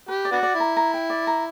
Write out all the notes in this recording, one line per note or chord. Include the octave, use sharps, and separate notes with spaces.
G4 B4
D5
B3 D4 F#4
D5
E4
A#5
A#5
G5
D5
A#5